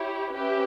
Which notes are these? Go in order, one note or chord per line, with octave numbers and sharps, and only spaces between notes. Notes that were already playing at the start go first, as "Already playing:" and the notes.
Already playing: E4 G4 C#5
C#4 G4 B4 E5